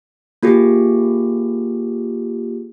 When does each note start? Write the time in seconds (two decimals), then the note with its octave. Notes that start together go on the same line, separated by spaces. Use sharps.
0.43 A#3 F4 G4 G#4